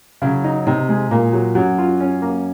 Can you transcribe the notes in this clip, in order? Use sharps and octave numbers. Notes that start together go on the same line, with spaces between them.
F#2 C#3 F#3
D#4
C3 D#4
G#3
A#2 A#3
F#3
F#2 F#3
F4
C#4
A#3